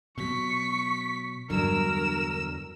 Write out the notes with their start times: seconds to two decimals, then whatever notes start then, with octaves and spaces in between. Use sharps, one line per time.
0.18 B2 F#3 C#6 B6
1.50 E2 G2 D3 F#3 A#4 E6 E7